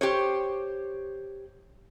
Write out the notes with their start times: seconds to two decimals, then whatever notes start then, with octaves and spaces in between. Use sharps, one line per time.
0.01 G4 C5 C#5